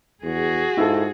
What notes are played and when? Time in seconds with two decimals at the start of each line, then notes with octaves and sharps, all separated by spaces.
0.24 E2 F#4 G#4
0.77 G#2 E4 F4 A4